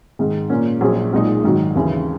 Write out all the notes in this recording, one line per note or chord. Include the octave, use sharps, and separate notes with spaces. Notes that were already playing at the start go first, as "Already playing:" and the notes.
G#2 D#3 G#3
A#2 A#3 C#4
A#1 A#2 F#3 C#4 G#4
B1 A#2 G#3 D#4 G#4
G#2 D#3 F#3
D#2 C#3 E3